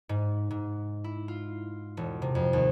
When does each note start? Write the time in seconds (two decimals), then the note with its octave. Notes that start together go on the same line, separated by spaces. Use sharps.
0.09 G#2
0.51 G#2
1.04 E4
1.28 F4
1.97 E1
2.22 C3
2.35 F2
2.53 D#2